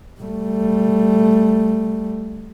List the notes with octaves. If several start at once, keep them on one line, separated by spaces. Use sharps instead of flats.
G3 A3